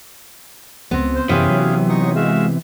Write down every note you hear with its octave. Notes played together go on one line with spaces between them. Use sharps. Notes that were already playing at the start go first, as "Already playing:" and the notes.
C#2 B3 C4
C5
F#2 C3 E3 B3 C#4 G#4 F5
F#3
D#4 C#6 D#6
G#3 F#4 E5 F5